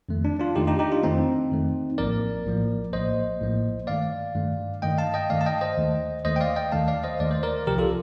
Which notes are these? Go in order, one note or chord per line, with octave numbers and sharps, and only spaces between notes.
F2 D#3 A3
D4
D4 F4
F2 D#3 A3 D#4 G4
D#4 G4
D#4 G4
D4 F4
F2 D#3 A3 C4 D#4
F2 D#3 A3
A#1 A2 F3 A#3 A#4 D5
A#1 A2 F3 A#3
A#1 A2 F3 A#3 C5 D#5
A#1 A2 F3 A#3
G2 D#3 A3 D5 F5
G2 D#3 A3
G2 D#3 A3 D#5 G5
F5 A5
D#5 G5
G2 D#3 A3 D5 F5
A5
D#5 G5
C5 D#5
D#2 D#3 A3
D#2 D#3 A3 C5 D#5
G5
D5 F5
D#5 G5
D#2 D#3 A3 F5 A5
D5 F5
C5 D#5
D#2 D#3 A3 D5
C5
A#4 D5
C2 C3 F3 G4 A#4
F4 A4